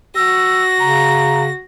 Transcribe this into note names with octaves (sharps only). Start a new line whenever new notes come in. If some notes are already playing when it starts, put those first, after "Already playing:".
F#4 E6 A#6
C#3 A#5